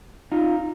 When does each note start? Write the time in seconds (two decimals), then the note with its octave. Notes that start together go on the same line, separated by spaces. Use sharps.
0.32 D#4 F4